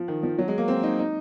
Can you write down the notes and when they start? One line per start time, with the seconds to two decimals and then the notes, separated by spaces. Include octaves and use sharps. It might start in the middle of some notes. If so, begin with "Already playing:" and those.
Already playing: F3
0.08 D#3
0.23 F3
0.38 F#3
0.48 G#3
0.58 A#3
0.68 C4
0.83 D#4
0.99 D#4